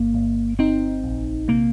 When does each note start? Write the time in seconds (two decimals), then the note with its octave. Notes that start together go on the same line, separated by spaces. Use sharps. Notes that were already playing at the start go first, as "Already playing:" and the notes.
Already playing: G1 A#3
0.14 G1
0.59 C4 D#4
1.04 A#1
1.48 C3 A#3